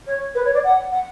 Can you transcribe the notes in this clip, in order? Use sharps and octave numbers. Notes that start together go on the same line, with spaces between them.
C#5
B4
C#5
D5
F#5
F#5